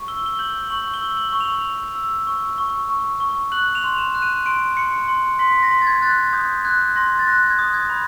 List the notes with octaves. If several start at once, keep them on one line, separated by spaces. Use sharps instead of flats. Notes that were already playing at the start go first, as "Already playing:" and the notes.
Already playing: C#6
E6 G7
G7
G6 F#7
C#6 F#7
G7
E6
F#7
C#6
F7
C#6
E6
C#6
C#6
C#6
C#6
F#6 F#7
F7
C6
E7
F#6
D#7
C6 D7
C6 C#7
C6 C#7
C6 B6
A#6
C6
A6
G#6
F#6 A6
G#6
D#6 G6
F#6 G#6
C6 A#6
A6
F#6 A#6
G#6
D#6
G#6
B5